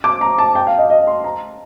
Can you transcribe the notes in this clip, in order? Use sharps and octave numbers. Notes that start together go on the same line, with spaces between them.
D6
A#5
A5
G5
F5
D#5
D#5
C6
A#5